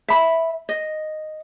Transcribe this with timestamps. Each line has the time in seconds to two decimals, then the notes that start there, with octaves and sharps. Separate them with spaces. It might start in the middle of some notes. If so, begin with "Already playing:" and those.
0.08 E5 B5
0.69 D#5